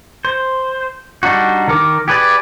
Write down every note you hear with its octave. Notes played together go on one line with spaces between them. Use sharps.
C5
G3 D4 D#4 F#4
D#3 A#4 D6
G4 G#4 B4 C#5 D5